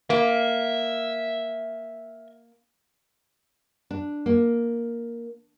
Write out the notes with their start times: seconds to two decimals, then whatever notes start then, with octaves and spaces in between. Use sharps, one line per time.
0.10 A#3 E5
3.91 D4
4.26 A#3